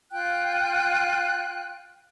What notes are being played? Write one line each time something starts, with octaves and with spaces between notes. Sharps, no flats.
F4 G5 F#6